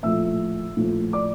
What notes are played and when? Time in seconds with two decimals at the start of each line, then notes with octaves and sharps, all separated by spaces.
0.03 A#1 A2 F3 A3 E5 E6
0.76 A#1 A2 F3 A3
1.13 D5 D6